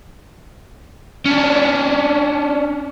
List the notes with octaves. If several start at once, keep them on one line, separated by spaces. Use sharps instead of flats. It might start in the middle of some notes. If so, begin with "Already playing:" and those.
C#4 D4